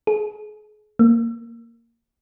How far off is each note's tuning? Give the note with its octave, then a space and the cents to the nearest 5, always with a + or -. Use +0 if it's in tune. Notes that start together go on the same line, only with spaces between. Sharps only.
G#4 +35
A#3 -10